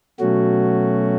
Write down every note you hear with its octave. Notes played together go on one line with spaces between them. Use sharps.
B2 F#3 A3 C#4 F#4